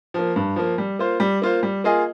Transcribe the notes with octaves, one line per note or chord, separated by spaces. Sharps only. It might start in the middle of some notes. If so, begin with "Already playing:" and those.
F3 A#3
G2
F3 A#3
G3
A#3 F4 C5
G3
A#3 F4 C5
G3
A#3 F4 G#4 D#5